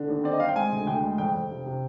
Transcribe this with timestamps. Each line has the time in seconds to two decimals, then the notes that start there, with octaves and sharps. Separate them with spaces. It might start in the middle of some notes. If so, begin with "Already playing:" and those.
Already playing: D3
0.09 D#2
0.24 C4 D5
0.33 D#5
0.40 C4 F5
0.48 G5
0.56 G#3 G#5
0.72 D2
0.87 D2 G5
1.03 G#3
1.18 F2 G5
1.35 F2
1.51 C3
1.66 C3